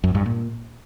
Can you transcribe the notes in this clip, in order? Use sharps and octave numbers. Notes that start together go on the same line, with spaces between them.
F#2
G2
A#2